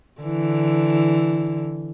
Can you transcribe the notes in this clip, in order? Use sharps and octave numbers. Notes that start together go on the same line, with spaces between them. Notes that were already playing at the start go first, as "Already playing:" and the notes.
D3 E3